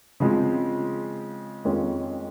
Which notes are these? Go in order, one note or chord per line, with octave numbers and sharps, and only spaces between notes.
C#3 F3 G#3 C4
F2 D#3 G#3 C#4 F4